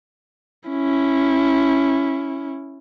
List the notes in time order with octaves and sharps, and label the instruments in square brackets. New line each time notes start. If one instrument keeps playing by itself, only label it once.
[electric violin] C#4 E4